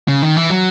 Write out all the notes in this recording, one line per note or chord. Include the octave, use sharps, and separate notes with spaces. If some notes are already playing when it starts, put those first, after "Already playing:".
C#3
D#3
E3
F#3